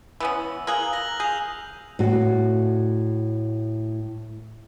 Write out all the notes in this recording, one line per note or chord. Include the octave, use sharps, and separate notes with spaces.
E3 B3 C#4 E6
A#3 G#4 A#4 F6 F#6 F#7
A#4 A#6 F#7
G#4 G6 F7
A2 F#4